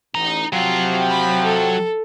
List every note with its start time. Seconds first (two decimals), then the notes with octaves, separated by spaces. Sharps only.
0.15 A1 D#4 A#5
0.53 C3 F3 F#3 F4 G5
1.10 B5
1.44 A4